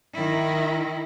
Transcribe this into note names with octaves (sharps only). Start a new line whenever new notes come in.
D#3 E4